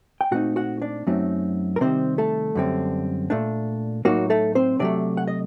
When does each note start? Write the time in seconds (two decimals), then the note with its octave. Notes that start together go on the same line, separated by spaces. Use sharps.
0.21 G5
0.31 A#2 A3 C4 D#4 F#4 F#5
0.56 F#4 F#5
0.82 D4 D5
1.07 F#2 F#3 A3 C4 D#4
1.76 A#4
1.81 C3 D#3 G3 C4 C5
2.18 A3 A4
2.55 F#2 D3 G3 C4
3.30 A#2 A3 D4
4.05 A2 F#3 A#3 D#4 F#4
4.30 A3 A4
4.55 C4 C5
4.80 C3 F#3 A3 D4 D5
5.17 F#5
5.28 D#5